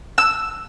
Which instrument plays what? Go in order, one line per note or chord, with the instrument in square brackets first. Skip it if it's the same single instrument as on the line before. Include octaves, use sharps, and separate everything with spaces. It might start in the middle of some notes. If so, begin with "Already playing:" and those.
[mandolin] E6